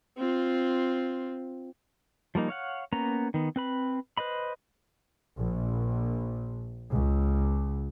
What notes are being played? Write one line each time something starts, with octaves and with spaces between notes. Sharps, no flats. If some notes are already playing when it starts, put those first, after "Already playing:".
C4 F4
F3 G3 A#3 D#4
C#5 F5 F#5
A#3 B3 C#4 A#5
D#3 B3
C4 B4 B5
B4 C5 D#5 B5
A#1
C#2